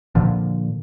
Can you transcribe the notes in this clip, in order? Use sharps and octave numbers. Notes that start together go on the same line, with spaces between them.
A#2 D3 F3